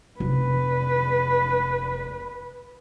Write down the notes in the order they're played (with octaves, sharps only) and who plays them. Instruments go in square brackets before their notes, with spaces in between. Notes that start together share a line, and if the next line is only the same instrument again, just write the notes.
[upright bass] F1 [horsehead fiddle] B4